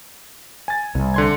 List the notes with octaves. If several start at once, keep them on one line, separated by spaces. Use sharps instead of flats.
G#5 A6
C2
D3 C6 G#6